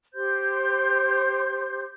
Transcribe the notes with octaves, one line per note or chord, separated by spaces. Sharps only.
G4 C5 C6 G6